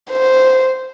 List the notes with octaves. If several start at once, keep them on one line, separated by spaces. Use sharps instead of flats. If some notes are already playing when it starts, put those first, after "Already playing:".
C5